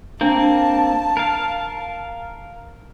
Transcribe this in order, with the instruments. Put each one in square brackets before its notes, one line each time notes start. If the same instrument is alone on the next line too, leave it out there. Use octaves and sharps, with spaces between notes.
[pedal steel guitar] A#3 C4 [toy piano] D4 [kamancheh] A5
[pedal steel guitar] A#4 F5